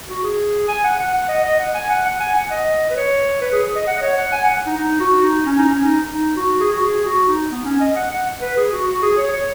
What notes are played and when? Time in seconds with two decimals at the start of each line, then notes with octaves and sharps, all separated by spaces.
0.08 F#4
0.23 G#4
0.68 G#5
0.84 F#5
0.99 F#5
1.14 F#5
1.29 D#5
1.45 D#5
1.60 F#5
1.74 G#5
1.90 F#5
2.06 F#5
2.20 G#5
2.35 F#5
2.51 D#5
2.90 B4
2.96 C#5
3.41 B4
3.52 G#4
3.64 G#4
3.76 D#5
3.87 F#5
3.97 D#5
4.02 C#5
4.17 F#5
4.32 G#5
4.44 F#5
4.66 D#4
4.77 D#4
5.00 F#4
5.23 D#4
5.46 C#4
5.59 D#4
5.69 C#4
5.84 D#4
6.14 D#4
6.37 F#4
6.60 G#4
6.72 F#4
6.82 G#4
7.05 F#4
7.28 D#4
7.51 B3
7.65 C#4
7.81 D#5
7.96 F#5
8.11 F#5
8.41 B4
8.57 G#4
8.72 F#4
8.87 F#4
9.02 G#4
9.18 C#5
9.32 C#5